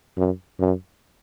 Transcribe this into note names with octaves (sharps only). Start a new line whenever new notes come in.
F#2
F#2